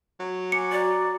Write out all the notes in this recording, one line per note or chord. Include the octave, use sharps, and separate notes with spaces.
F#3
G#5 D6 C#7
F#4 D5 A#5 D6